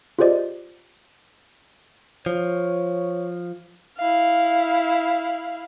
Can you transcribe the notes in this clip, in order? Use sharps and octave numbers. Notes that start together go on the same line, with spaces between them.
F4 G4 G#4 C5 D5 D#5
F3 C#5
E4 F5